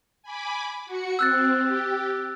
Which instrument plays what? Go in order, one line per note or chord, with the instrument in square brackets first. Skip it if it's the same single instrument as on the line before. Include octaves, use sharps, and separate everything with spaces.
[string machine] G#5 B5 D6
F#4 C#7
[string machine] C4 [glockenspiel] E6 F#6 A6
[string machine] G4